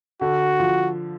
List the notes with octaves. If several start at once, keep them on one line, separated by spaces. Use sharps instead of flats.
D3 F#4
F3